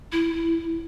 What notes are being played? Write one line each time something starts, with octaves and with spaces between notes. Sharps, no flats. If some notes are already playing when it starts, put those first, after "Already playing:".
E4